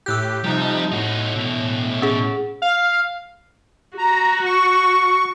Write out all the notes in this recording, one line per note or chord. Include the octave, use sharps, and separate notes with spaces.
A2 G4 E6 F#6 G6
C3 F3 G3 D#4
A2 D#4 F#4
B2 E4
C#4 G#4
F5
F#4 A#5
C#6